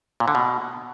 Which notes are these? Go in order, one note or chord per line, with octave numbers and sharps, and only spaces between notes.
A#2
D3
B2